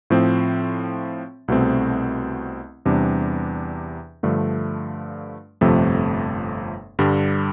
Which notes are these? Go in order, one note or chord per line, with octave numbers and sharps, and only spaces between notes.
A2 F3 C4
C2 B2 A3 C4
E2 C3 G3 D4
G2 D3 F3 A3
G1 F2 C3 F3 A3
G2 D3 G3